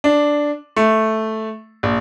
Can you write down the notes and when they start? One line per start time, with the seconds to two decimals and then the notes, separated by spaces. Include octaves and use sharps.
0.04 D4
0.77 A3
1.83 A#1